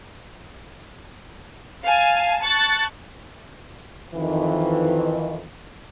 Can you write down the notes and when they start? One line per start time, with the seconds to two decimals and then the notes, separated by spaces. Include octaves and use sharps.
1.85 F5 G#5 A5
2.42 A5 C#6 F#6 A6
4.14 F2 D#3 E3